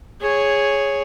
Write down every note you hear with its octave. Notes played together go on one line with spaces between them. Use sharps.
G#4 C#5